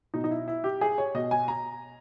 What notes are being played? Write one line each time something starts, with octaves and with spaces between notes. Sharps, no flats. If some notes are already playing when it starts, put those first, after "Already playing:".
B2 D#4
D#4
E4
E4
G4
G#4
C#5
B2 D#5
G#5
A#5